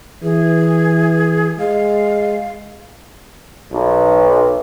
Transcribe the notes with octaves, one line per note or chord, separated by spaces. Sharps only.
E3 G#4
G#3 F5
B1